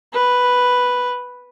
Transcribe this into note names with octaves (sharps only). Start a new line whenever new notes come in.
B4